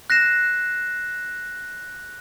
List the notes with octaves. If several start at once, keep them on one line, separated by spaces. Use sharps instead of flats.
F#6 A#6 C7 E7